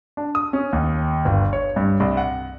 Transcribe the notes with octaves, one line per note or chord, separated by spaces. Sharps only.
D4
D#6
C#4
D#2
G1
C#5
G2
C2
F#5